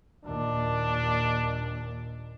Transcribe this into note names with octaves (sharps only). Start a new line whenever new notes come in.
D#2 A#2 D4